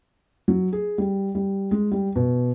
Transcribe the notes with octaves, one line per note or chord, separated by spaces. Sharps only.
F#3
G#4
G3
G3
G#3
G3
B2